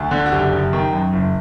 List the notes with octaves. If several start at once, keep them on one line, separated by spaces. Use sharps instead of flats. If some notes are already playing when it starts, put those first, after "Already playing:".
Already playing: D2
D3
F#4
F#1 G4
F#1
D#3
F#2
F#1